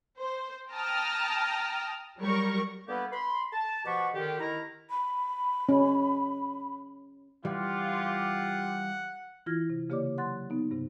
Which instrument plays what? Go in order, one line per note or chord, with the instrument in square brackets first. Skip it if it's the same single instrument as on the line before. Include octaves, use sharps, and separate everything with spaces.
[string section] C5
G5 A5 A#5 D#6 F6
F#3 G3 A#4 C#6
[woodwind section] D3 G3 A#3 B3 G4 B4
B5 C6
A5
B2 F3 G4 F#5 B5 C#6
D3 D#3 G4
D#3 E4 A#5
[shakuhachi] B5
[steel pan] C#4
[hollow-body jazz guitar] E3 G3 [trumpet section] F4 G4 [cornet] F#5
[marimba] E3 E4 F4 F6 G#6 A#6
C3
C#3 A#3 G4 C#5 D5 D6
F#3 F#5 C6 F#6 A6
B3 D#4
G2 C3